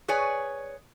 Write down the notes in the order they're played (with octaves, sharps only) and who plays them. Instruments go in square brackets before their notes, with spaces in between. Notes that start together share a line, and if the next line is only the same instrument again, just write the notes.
[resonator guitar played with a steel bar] G#4 B4 C#5 D5 G#5